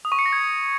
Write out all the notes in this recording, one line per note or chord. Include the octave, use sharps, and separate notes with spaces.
D#6
C#6
C#7
A#6
G#6